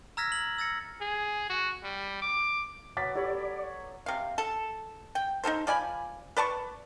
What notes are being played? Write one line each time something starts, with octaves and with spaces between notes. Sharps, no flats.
A#5 E6 F6 G#6 A#6 B6
F#7
E6 A6 A#6 C#7
G#4
F#4
G3
D6
F#3 B3 D6 A6 B6
G4 A4 C#5 D5 B5
C3 F5
A4
G5
D#4 F4 A4 C5
F3 D5 G#5 B5
B4 D5 A5 C#6